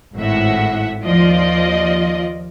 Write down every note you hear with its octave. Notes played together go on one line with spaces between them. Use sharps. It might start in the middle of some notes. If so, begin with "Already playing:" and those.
G#1 A2 E5 F#5
D#2 F3 F4 D5 D#5